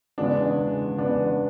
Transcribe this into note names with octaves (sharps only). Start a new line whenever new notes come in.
E2 C#3 G#3 B3 D4
E2 C#3 G#3
E2 C#3 G#3 B3 D4